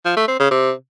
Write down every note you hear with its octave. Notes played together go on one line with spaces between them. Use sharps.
F3
A3
C4
C#3
C3